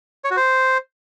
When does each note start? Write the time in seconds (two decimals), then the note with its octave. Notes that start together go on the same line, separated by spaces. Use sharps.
0.24 C#5
0.31 F#4
0.37 C5